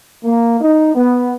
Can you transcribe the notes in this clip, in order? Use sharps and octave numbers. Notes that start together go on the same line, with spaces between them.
A#3
D#4
B3